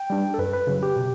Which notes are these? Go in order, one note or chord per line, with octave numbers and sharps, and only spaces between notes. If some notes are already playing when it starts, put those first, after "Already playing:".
Already playing: G5
G3 D4
A4
F#2 B4
B4
C#3 F#3
G4
B2